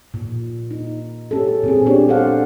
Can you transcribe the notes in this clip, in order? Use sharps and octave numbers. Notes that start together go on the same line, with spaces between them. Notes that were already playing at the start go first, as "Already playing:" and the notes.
A#2
D#4
C#4 G4 A4
A#2 C4 G#4
B3 D4 G4 C#5
D4 A4 C5 D5 F5 F#5